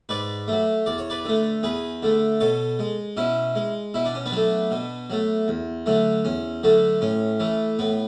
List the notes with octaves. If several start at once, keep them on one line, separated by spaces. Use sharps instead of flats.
G#2 B4 D5
F#3 A3
E2 D5
C#5
B4 D5
D3 A3
E2 G#4 B4
D3 A3
B2 A4 C#5
G#3
B2 C#4 E4
G#3
B2 E4
D4
C#4
B3 D4
F#3 A3
B2
F#3 A3
E2
D3 F#3 A3
E2 C#4
D3 F#3 A3
A2 C#4
E3 A3
A2 B3